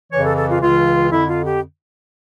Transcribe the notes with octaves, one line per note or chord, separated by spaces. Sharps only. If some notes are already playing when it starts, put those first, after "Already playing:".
F2 C#3 E3 C#5
A4
A4
F4
C#2 C#3 E3 F4
F2 D3 E4
F4
G4